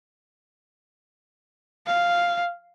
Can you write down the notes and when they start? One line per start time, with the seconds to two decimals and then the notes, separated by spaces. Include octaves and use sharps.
1.86 F5